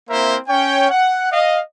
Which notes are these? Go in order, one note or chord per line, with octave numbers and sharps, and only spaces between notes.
A#3 C4 E4 A#4 C5 E5
C#4 C#5 G5
F#5
D#5 F5